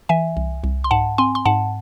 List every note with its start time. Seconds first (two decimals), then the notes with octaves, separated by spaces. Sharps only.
0.09 E3 E5 G#5
0.37 C2
0.64 C2
0.84 C6
0.91 G#2 F#5 A5
1.18 C4 G#5 C6
1.35 C6
1.45 G#2 F#5 A5